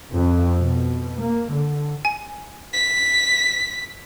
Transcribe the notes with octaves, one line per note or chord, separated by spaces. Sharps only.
F2
B2
A#3
D3
G#5
B6